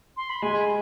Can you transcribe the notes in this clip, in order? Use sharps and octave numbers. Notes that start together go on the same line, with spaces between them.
C6
B5
G#3 G#5